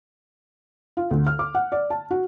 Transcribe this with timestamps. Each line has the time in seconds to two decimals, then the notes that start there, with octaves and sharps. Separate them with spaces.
0.97 F4
1.11 D2
1.27 F6
1.39 D6
1.55 F#5
1.72 D5
1.90 A5
2.11 F#4